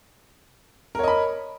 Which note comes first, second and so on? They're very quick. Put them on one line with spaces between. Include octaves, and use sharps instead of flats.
A#4 C#5 D#5 B5